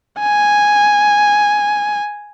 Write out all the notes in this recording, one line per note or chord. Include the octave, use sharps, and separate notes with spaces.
G#5